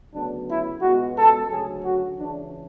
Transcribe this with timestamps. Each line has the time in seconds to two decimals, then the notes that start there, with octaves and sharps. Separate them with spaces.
0.14 D2 C#3 F#3 B3 D4
0.48 E4
0.82 C#2 B2 G#3 B3 F#4
1.17 A4
1.50 D2 C#3 F#3 G#4
1.84 F#4
2.18 C#2 C#3 E3 D4